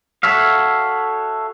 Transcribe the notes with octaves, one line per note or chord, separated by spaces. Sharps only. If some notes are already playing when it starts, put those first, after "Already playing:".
F#4 A4 C#5 E5 F5